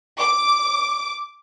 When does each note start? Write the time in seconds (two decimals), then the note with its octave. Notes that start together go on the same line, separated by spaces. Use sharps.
0.20 D6